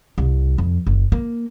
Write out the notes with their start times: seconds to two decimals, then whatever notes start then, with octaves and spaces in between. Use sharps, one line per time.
0.18 C2
0.58 F2
0.87 F#1
1.12 A#3